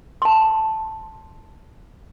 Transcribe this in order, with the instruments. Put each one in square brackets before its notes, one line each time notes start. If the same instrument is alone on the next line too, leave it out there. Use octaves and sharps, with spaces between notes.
[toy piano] A5 C6